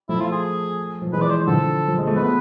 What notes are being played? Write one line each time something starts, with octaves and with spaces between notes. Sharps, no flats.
F3 A3 E4
F4
G#4
F3
E3 G#3 B4
D5
C5
D3 F3 A4
F3
G#3
A3
G#3 B3 B4